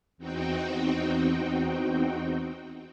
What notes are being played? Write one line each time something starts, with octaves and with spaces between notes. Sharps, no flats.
E2 C4 D#4 F#4 G5